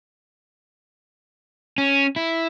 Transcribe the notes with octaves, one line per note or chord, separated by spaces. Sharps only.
C#4
E4